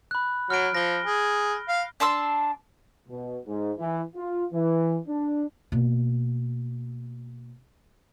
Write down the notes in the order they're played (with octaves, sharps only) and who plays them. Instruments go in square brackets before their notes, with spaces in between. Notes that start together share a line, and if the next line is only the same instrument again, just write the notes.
[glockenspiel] B5 F#6
[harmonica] F#3 [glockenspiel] F6 D7
[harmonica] F3 [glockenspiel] A#6 G7
[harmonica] G#4
F5
[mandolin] D4 A5 C6 E6
[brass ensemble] B2
G#2
E3
F4
E3
D4
[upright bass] B2 A#3